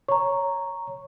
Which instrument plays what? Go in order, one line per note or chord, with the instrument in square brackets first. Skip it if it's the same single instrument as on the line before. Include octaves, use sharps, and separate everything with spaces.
[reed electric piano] C#5 [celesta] A#5 C#6